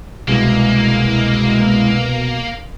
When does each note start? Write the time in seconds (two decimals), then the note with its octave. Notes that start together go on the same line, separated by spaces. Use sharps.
0.28 C2 B2 G#3 A#3 E4